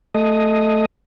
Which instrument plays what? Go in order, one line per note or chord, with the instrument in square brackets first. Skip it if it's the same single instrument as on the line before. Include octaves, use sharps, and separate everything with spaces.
[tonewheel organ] A3 D#5